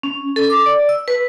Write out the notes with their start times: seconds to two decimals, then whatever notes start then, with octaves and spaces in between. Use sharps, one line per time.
0.03 C#4
0.36 A4
0.50 D6
0.66 D5
0.89 E6
1.08 B4